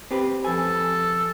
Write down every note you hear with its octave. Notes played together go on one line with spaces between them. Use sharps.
C4 G4 B4
F2 A4 G#5